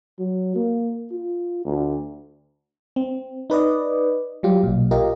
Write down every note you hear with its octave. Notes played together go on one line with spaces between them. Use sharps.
F#3
A#3
F4
D2
C4
D#4 B4 D5 D#5
F#3 G3 F4 G4
B1 A#2
F4 G4 A#4 D#5